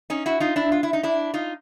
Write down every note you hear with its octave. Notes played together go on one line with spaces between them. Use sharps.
C#4 D#4
E4 F#4
D#4 F4
D4 E4
F4
E4
D#4
D4 E4
D#4 F4